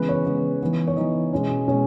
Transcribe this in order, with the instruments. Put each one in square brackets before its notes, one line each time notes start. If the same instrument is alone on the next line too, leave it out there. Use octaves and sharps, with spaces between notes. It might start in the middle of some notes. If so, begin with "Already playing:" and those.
Already playing: [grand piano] C#3 E3 G#3 B3 B4
C#5
C#3 E3 G#3 B3
E3 B3 D#4
C#5
E3 B3 D#4 D#5
B2 G#3 C#4
B2 G#3 C#4